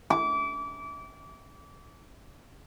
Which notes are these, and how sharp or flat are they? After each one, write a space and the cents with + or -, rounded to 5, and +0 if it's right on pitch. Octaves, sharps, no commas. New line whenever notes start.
D6 -30